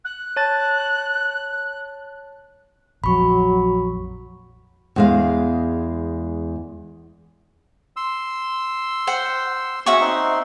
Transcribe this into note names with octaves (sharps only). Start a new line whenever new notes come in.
F#6
C#5 A5 A6
A#1 F2 F#3 B5 C#6
E2 G#3 F5
C6 E6
C5 F#5 G5
C#4 F#4 G#4 E5 F#5 C#6
C4 D#4 C6